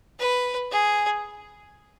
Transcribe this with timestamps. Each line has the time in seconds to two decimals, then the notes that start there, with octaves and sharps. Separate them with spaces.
0.19 B4
0.71 G#4